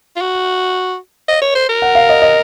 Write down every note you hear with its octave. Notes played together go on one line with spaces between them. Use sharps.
F4
F#4
D#5
C#5
C5
A#4
F#5
F5
D#5
D#5